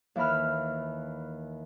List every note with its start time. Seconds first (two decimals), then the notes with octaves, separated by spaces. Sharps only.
0.16 D#2 E3 E5 B5 F6